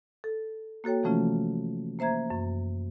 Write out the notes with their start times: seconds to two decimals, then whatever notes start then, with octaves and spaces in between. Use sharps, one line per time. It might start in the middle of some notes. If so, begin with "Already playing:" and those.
0.24 A4
0.84 A#3 F#4 A4 C#5 G5
1.03 C3 E3 F3 A3 C#4 F4
1.99 A#3 C5 E5 A#5 G#6
2.30 F#2